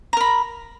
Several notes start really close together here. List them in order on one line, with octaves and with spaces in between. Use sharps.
A#5 A#4 B5